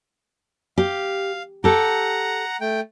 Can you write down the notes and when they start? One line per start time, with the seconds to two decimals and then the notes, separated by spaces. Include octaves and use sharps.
0.78 G4 F5
1.64 G4 A4 F#5 A#5
2.61 A3 G5